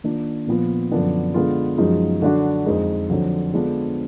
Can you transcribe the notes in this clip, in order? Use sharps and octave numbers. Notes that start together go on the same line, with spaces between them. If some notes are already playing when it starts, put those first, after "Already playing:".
D#3 A#3 D4 F4
A#2 F3 B3 F4
F#2 D3 F3 B3 D4
D3 G#3 B3 F4
F#2 F3 G#3 D#4 F#4
D3 F#3 D4 F#4
F2 F3 G#3 D#4
F2 D3 F#3
D3 G#3 B3 D4 F4